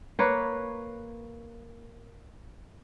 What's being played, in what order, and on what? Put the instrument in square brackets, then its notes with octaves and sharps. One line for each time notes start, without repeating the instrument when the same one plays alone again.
[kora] A#3 B4 C#5